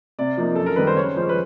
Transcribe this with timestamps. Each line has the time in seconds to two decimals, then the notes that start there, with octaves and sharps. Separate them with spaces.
0.19 C3 D5
0.37 F3 A#3 D#4
0.56 F#2 A4
0.66 A#4
0.76 D#3 G3 B4
0.87 C5
0.97 C#3 C#5
1.16 F3 G#3 C#4 C5
1.29 B4